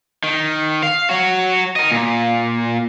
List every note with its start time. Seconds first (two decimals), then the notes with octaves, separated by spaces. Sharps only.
0.24 D#3
0.83 F5
1.10 F#4 C#5
1.76 A#4 D#5
1.91 A#2